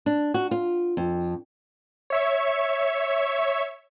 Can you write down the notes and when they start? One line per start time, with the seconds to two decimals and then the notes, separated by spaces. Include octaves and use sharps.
0.06 D4
0.34 F#4
0.51 F4
0.97 F2
2.10 C#5 E5 C#6